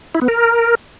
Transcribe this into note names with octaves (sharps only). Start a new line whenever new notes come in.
E4
B3
A#4